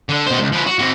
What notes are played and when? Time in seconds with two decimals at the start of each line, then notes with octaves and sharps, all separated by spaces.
0.09 D3
0.27 B2 C5
0.40 C#2
0.52 F3 B4
0.66 F#4
0.79 C4 F#4